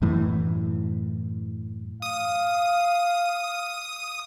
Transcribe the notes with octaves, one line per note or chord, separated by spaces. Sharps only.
F#2 A2 E3
F5 D#6